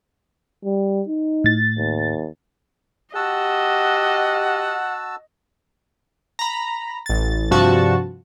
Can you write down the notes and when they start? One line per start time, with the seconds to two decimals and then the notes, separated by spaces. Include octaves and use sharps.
0.65 G3
1.08 D#4
1.44 A2 A6
1.77 D#2
3.15 F#4 G4 D#5 F#5 A5 E6
6.39 A#5 B5
7.06 A1 A6
7.51 G2 C3 F3 F#4 A5 C#6